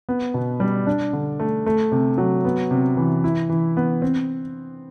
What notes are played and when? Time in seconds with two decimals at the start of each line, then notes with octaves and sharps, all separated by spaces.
0.09 B3
0.34 B2
0.60 G3
0.87 D4
1.13 D3
1.40 A3
1.66 A3
1.92 C3
2.18 F#3
2.45 B3
2.71 C3
2.97 E3
3.24 E4
3.49 E3
3.77 B3
4.02 C4